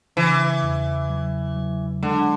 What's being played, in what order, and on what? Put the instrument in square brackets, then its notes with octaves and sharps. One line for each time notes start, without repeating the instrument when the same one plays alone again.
[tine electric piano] C#3 [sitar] E3
[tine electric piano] E2
F#3
F#3
[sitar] D3 [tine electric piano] G#3